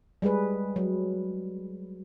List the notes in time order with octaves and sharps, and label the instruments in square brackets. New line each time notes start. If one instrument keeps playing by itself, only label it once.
[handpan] G3 G#3 G#4 B4
F#3